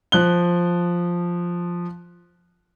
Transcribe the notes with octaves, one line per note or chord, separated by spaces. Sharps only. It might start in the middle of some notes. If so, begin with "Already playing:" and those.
F3 F#6 G7